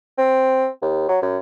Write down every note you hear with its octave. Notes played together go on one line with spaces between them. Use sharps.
C4
D#2
F#3
F#2